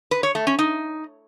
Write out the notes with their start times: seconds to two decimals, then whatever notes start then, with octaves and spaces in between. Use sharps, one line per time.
0.11 B4
0.23 C#5
0.35 A3
0.47 C#4
0.59 D#4